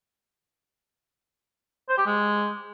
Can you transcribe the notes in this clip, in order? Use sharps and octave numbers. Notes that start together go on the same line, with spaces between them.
C5
G4
G#3